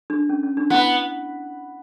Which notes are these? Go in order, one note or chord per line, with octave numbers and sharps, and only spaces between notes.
D4
C#4
C#4
D4
B3 E4